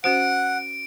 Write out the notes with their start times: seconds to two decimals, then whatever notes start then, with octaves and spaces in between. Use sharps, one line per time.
0.04 C#4 F#4 C5 F#5 D7